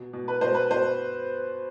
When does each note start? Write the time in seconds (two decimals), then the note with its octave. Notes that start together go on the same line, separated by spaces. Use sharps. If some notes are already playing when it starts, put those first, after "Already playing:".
Already playing: B2
0.13 B2
0.28 B4
0.41 B2 C5
0.55 B4
0.71 B2 C5